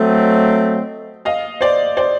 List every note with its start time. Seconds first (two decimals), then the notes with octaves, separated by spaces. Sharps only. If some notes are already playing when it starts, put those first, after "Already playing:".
Already playing: F#3 A3 C4 D#5
1.25 D#5 F5
1.61 C5 D5
1.97 C5 D5